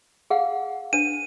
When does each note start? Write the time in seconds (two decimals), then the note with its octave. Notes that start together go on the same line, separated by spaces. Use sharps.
0.30 G#4 F5 F#5
0.93 D4 B4 D#7